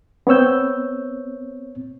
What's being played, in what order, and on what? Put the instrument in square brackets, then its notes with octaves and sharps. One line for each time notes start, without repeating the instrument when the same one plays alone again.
[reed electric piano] B3 C4 C#5 E6 G6